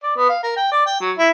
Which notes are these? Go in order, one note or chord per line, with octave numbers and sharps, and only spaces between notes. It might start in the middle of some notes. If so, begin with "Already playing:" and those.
D5
B3
F5
A#4
G5
D5
G5
F#3
E4